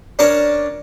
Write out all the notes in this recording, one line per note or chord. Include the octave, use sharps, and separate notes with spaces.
C#4 D4 A#4 A5